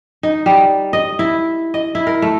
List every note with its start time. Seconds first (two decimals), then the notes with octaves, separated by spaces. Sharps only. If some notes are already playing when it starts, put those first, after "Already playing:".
0.23 D#4
0.46 G3
0.93 D#5
1.19 E4
1.74 D#5
1.95 E4
2.07 A#4
2.22 A3